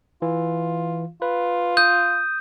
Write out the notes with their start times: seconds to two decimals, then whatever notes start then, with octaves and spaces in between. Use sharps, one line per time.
0.22 E3 F4
1.22 F4 B4
1.77 D#6 G6